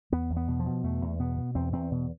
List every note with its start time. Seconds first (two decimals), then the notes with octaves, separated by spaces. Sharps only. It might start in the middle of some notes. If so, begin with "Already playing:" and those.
0.12 E2 B3
0.30 E2
0.37 B3
0.48 B2
0.60 F3
0.66 B2
0.84 E2 A3
1.01 E2
1.19 B2 B3
1.37 B2
1.55 E2 C4
1.73 E2 C4
1.91 B2